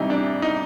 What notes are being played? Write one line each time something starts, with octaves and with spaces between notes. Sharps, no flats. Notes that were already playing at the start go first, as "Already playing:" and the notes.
Already playing: C3 E3 G3 D#4
D4
D#4